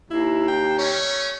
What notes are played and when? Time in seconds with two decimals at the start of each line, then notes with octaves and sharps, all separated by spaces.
0.11 D#2 E4
0.48 G5
0.79 G3 A3 C#4 C#5